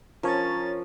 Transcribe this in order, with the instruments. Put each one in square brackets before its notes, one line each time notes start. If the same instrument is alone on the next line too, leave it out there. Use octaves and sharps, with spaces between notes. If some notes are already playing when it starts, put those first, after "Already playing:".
[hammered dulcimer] F3 [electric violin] C#4 A6 [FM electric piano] A#4 C#5 A#5